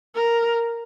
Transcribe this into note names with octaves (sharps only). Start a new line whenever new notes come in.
A#4